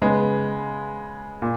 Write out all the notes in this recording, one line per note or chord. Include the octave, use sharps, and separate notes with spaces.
C#3 G#3 B3
A#2